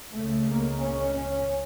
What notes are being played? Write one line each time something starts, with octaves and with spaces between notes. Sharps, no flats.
C#2 C#3 A3
A#3
C#4
C#4